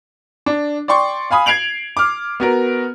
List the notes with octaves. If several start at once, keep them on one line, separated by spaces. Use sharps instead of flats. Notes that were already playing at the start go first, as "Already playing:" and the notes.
D4
D5 G5 C6 C#6
F5 G#5 B5 D#6
G#6 C7 D7 F7 F#7
D6 F6
B3 F#4 A#4